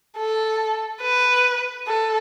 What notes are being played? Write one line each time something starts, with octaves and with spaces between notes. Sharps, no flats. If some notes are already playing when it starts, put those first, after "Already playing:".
A4
B4
A4